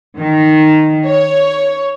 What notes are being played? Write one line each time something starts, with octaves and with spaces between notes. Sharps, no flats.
D#3
C#5